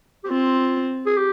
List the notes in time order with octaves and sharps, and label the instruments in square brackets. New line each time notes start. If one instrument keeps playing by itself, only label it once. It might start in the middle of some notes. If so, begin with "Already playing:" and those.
[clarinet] G4
[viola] C4 [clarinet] F4
[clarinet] G#4
G4